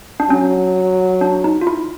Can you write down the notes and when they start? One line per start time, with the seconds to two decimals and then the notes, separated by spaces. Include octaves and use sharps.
0.20 D4
0.30 F#3 C#4
1.21 D4
1.44 D#4
1.61 F4
1.67 E4